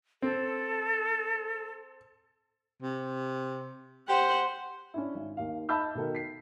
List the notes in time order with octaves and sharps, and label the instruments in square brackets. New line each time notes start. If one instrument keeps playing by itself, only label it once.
[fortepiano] C4 [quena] A4
[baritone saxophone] C3
[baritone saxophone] G4 [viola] C5 F#5
[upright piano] C#4 D4 E4
G#1
D#2 F5
D#5 E5 A5 B5 E6 G6
B2 D#3 A4 A#4
B6 C7